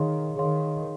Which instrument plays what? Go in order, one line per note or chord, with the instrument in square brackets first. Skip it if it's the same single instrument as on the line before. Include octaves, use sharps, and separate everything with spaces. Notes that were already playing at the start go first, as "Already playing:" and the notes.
Already playing: [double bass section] D#3 [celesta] G#4 C#5 F5 C6
[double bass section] D#3 [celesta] G#4 C#5 F5 C6